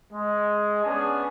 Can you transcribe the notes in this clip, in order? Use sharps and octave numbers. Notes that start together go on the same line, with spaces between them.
G#3
B3 C#4 D4 G#4 G#5